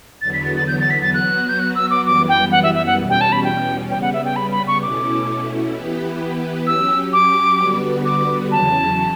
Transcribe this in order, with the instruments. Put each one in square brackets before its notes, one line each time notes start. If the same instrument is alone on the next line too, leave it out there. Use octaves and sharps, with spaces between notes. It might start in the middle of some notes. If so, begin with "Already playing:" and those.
[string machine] E2 D3 F#3 B3 [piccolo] A6
[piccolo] B6
A6
A6
G6
A6
B6
A6
[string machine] F#3 B3 F#4 [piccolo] F#6
[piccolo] G6
F#6
E6
D6
[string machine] F#2 E3 G3 B3 [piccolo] D6
[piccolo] G5
F#5
E5
E5
F#5
[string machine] E2 B2 G3 C#4
[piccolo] G5
A5
B5
G5
[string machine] C#3 G3 B3 [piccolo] G5
[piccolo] F#5
E5
G5
B5
B5
C#6
[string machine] B2 A3 C#4 E4 [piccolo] D6
[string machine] E3 B3 E4 G4 B4
[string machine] F#3 C#4 G4 [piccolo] E6
[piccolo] D6
[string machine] D3 G3 B3 F#4 B4
[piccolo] D6
[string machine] E2 C#3 F#3 C#4 [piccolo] A5